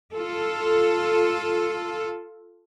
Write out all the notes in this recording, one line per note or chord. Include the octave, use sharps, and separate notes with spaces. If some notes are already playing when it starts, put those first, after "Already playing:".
F4 A4